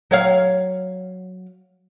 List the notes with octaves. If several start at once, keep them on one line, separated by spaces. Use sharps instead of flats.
F#3 C#5 F5